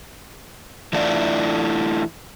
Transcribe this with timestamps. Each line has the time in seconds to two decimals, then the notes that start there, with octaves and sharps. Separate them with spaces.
0.93 E3 A3 D4 E4 F4 D5